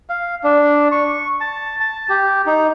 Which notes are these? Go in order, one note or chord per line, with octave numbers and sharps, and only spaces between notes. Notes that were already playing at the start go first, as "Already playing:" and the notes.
F5
D4
C#6
A5
A5
G4
D#4